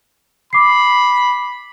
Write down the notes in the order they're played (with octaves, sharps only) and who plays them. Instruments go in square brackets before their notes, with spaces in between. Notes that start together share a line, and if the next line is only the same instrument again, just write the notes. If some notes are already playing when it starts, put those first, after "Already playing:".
[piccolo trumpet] B5 [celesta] D6 C7